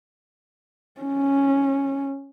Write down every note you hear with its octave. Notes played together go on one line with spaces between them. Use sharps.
C#4